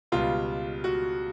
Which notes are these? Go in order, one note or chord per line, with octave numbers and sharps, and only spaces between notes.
C#2 B2 G3 F4
F#4